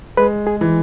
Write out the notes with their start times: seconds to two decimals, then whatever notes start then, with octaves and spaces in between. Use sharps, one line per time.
0.17 G#3 B4
0.47 G#4
0.61 E3